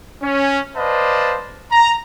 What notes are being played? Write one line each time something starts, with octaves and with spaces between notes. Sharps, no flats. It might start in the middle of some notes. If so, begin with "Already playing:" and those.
C#4
B4 C5 D5 D#5 F5 A5
A#5